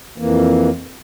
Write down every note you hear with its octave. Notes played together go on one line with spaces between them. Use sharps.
F2 E3 A#3